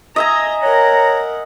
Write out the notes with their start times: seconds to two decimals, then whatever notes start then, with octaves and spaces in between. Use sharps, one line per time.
0.16 D#5 E5 G#5 A#5
0.62 A#4 C#5 F#5 A#5